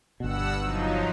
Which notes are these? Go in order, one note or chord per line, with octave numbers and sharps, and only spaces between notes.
G1 G2 B2 F#5 E6
F3 F#3 D#4